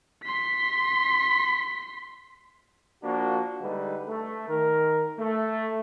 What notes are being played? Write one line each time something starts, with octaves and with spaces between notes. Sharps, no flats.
C6 B6
F3 A#3 D4 F#4
D3 G3 G#3 D#4 B4
A3
D#3 A#4
A3